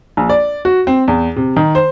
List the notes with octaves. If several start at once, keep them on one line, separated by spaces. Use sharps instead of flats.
A#1
D5
F#4
C4
E2
C3
D#3
C5